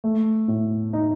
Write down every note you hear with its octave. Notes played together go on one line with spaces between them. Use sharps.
A3
A2
D#4